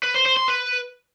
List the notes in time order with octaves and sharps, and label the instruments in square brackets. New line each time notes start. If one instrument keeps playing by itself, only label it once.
[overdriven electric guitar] B4
C5
C5
C6
B4